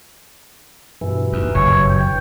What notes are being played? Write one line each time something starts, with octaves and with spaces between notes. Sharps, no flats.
G2 B2 E3
D#2
F#1 C#5
G5